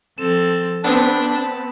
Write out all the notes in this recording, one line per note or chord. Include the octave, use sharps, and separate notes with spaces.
F3 C4 A4 E7
B3 C4 D4 A5 B5